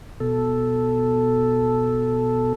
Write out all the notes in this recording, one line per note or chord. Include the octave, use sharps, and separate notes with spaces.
B2 A4